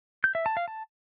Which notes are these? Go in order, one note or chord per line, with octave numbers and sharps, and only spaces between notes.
G6
E5
A5
F5
A5